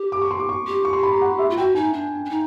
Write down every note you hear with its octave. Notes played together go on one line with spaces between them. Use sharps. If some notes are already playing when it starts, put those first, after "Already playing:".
Already playing: G4
D6
C#6
C6
D6
C#6
G4
C#6
C6
B5
A#5
F#5
E5
F4
F#4 G5
D#4 G#5
D4
D4
D#4